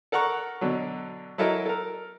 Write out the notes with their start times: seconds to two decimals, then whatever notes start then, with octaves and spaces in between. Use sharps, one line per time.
0.12 A4 A#4 F#5 A#5 C#6 F#6
0.61 B2 D3 F#3
1.38 F#3 E4 A4 A#4 D#5
1.66 A4 A#4